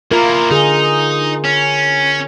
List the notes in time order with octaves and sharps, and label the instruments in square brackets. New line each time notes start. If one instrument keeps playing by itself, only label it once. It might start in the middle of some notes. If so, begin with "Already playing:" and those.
[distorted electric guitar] A#3 E4 [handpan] F4 A#4
[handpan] D3 G#4 [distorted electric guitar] D#4
[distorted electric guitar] C#4